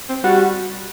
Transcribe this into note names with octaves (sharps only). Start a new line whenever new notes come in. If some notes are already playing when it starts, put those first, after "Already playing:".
C4
G3 F#4